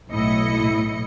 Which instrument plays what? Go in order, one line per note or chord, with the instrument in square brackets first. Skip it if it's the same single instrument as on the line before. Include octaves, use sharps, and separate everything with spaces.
[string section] B1 A2 E4 D#5 C#7